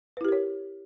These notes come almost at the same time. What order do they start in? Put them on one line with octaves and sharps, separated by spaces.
B4 E4 G4 A#4 C#5